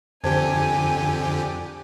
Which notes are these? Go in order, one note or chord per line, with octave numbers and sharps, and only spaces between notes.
F2 D3 G4 C5 G#5 A5 G#6